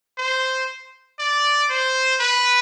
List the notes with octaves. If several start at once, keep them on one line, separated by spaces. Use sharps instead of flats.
C5
D5
C5
B4